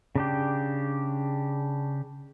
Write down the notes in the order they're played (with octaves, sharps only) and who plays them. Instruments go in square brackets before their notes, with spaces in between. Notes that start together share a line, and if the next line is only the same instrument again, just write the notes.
[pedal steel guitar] C#3 D4 G4